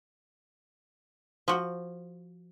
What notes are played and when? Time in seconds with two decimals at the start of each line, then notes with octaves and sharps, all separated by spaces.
1.48 F3 F#4